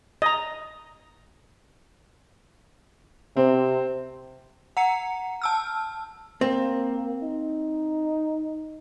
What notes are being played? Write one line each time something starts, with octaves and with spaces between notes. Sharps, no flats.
D#5 A#5
C3 C4
F#5 A#5 C#7
A5 E6 F6
A#3 C4
D#4